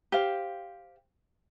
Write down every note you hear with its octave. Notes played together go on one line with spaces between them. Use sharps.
G4 C5 F5